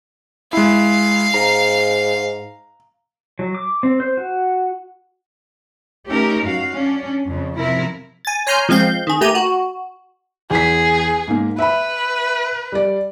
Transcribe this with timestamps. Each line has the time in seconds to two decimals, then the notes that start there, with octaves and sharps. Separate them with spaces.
0.53 G#3 E4 F5
1.34 G#2 A#5
3.39 F#3
3.55 D6
3.83 C4
4.00 C5
4.17 F#4
6.09 A3 C#4 D#4 G4 A#4
6.43 F#2 F#4 F5
6.74 C#4 D4
7.25 F2 C#3
7.57 C3 F3 E4 A#4
8.25 G#5 A6
8.47 C#5 G#5 A#5 C6 F6 G6
8.69 F3 G#3 C4 F5 G6
9.07 D#3 G#4
9.21 A3 A#3 G4 A#5 D#7
9.35 F#4
10.51 E2 G#4 B6
11.28 G#2 A#3
11.58 B4 E5 B5
12.72 G3 D5